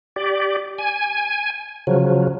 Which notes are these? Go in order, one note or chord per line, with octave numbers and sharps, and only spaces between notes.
G4 D5
G#5
C#3 F3 F#3